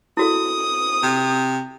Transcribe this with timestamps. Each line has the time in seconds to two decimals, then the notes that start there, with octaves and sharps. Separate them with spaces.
0.17 E4 F#4 A4 D#6
1.03 C3